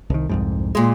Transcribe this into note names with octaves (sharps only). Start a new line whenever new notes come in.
C2 D#3
C2 F2 G#2
A#2 G#3